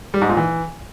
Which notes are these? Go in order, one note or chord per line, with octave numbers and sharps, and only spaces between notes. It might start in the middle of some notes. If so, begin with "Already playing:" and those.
G3
G#2
A#2
E3